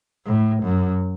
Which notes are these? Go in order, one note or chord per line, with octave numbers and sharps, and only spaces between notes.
A2
F#2